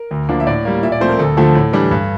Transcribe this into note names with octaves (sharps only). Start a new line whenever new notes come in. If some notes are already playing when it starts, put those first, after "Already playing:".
Already playing: A#4
D2
D3 F3 A#3 D4
E5
A2 D5
G3 A#3
A#2 E5
D5
F3 A3 C4 C5
A#4
D2 A4
D3 F3 A3 A4
A2
E3 G3 D4
G2